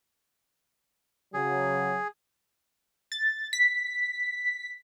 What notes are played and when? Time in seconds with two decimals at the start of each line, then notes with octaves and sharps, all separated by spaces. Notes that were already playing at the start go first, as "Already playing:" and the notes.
1.34 C#3 F#3 G#4
3.12 A6
3.53 B6